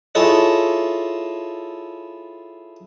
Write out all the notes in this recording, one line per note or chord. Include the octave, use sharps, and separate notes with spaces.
E4 F4 G#4 A4 C#5 D#5